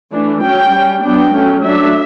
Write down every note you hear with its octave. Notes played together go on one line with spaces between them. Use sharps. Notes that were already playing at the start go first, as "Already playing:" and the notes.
E3 A3 D4
F#3 C#4 G5
G3 C#4
F#3 B3 D4 G5
F#3 A3 C#4
F#3 A3 D4 E5